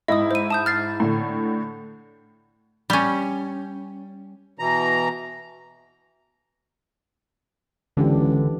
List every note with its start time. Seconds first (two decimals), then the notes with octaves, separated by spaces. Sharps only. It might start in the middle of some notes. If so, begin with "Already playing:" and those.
0.08 G#2 E4 D#5 D#6
0.31 C5 D#7
0.50 A5 D#6 G6
0.66 F6 A6 C7
1.00 A2 D3
2.90 G3 C#4
4.59 B2 E3 A#5
7.97 C#2 D3 E3 D4 G4